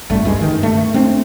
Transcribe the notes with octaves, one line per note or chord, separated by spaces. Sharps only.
G#1 F#2 G3 A3
C#2 G2 G#3
D#3
G2 A3
A3 C4 D4